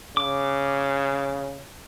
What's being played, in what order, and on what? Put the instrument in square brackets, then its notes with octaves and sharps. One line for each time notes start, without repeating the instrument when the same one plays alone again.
[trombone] C#3 [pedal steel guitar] D6